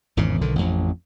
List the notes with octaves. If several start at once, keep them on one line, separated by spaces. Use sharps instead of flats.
G#1 E2 G#2 C#3
B1 D3 D#3
A1 F2